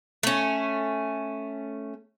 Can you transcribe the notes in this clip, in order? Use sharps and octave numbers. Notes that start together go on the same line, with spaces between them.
A3 C#4